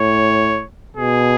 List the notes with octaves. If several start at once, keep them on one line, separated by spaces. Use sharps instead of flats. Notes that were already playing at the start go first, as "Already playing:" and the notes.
Already playing: A2 C#5
B2 G#4